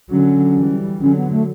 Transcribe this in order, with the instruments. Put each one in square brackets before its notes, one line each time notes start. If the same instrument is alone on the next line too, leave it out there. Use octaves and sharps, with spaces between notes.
[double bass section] D3 F#3 [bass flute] C#4
[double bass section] E3 G3
[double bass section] D3 F#3 [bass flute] C#4
[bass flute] B3
A3